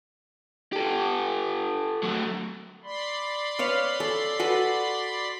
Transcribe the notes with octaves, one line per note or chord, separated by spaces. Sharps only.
G4 A4
F#3 A3
D5 B5 C6
B4 C#5 F5
A4
F#4 A4 B4